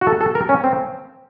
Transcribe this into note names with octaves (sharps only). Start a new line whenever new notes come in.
F#4
A4
A4
A#4
C#4
C4